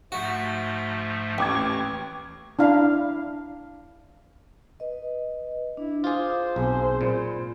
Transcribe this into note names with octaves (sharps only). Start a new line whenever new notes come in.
G#2 F3 A3 F#4
A1 D#2 G5 C#6 D6 G#6
D4 E4 F5 B5
B4 D#5
D4 E4
F4 G#4 C5 F5 D6
B1 C4 G#4 G#5
A#2 B5